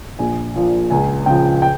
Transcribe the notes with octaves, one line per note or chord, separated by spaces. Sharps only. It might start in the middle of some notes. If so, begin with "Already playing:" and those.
A#1 G#5
A#2 F3
C#2 G#5
C#3 F3 G5
G5